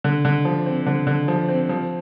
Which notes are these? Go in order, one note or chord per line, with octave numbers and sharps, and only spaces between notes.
D3
D3
F3
C4
D3
D3
F3
C4
F3